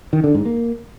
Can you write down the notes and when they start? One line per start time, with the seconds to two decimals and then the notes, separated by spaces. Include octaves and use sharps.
0.13 D#3
0.24 D3
0.35 G#2
0.45 A#3